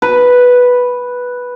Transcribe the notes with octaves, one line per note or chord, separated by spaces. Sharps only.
B4